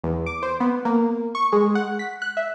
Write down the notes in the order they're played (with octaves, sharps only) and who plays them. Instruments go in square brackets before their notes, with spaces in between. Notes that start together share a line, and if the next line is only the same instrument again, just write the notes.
[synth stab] E2
D6
C5
B3
A#3
C#6
G#3
F#5
B6
F#6
E5